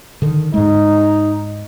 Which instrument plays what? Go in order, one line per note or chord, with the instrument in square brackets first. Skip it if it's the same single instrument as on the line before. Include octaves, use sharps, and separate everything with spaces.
[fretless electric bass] D3 D#3
[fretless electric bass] G#2 G#3 [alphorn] D#4